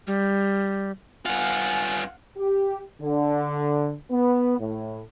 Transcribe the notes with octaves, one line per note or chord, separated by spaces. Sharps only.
G3
G2 F4 F5 F#5 G#5
G4
D3
B3
A2